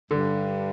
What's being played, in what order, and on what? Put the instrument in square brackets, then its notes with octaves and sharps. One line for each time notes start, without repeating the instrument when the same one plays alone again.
[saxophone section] G2 [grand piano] D3